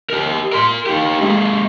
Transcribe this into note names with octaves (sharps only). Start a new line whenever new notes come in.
G4 A#4
A#4 C6
D#4 G4
G#3 A#3